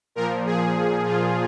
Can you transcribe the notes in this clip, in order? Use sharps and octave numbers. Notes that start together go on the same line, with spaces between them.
A#2 F3 A#4
G#4
F4